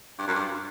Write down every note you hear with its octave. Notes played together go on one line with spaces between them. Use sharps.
G2
F#2
G2